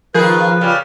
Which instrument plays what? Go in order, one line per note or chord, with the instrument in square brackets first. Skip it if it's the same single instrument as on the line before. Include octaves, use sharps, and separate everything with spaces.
[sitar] D#3 G#4 [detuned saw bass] F3 [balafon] A#4 [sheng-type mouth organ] B4
[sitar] C#3 G3